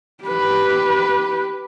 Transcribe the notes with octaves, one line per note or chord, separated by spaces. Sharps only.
G4 B4